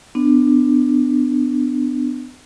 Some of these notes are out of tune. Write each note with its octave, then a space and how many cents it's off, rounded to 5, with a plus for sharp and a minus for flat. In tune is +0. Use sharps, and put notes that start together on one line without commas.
B3 +30 D4 +15